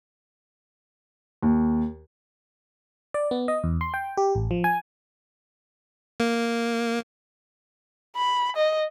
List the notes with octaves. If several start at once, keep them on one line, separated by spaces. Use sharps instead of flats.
D#2
D5
B3
D#5
E2
C6
G5
G4
A1
F3
G#5
A#3
B5
D#5